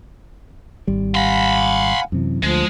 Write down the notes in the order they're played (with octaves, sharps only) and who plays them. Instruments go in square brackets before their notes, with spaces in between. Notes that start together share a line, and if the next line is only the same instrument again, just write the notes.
[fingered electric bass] G#1 G3
[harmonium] F5 F#5 G#5 [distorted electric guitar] B5 C6
[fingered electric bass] F#2 C3 E3
[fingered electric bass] D2 [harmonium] F3 [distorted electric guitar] G#3